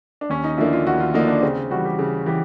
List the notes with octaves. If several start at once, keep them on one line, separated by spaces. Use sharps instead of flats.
D4
D#2 C#4
D#4
D3 F3 A#3 D4 E4
F4
D#2 F#4
F4
D3 F3 A#3 D4 D#4
D4
C#3 C4
E3 G3 F#4
G4
C#3
E3 G4